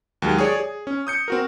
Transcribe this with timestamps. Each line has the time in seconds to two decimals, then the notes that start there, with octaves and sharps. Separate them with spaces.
0.22 D#2 F#3 G#3
0.38 G#4 C#5 D5
0.56 G#4
0.87 C#4
1.07 D#6 G6 C#7
1.28 C4 F#4 A#4